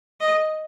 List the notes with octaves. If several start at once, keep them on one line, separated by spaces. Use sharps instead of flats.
D#5